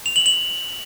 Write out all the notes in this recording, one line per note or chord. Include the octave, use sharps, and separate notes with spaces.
F7
F#7
F#7